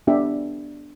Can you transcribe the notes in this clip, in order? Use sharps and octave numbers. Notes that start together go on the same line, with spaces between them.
B3 D4 G4 E5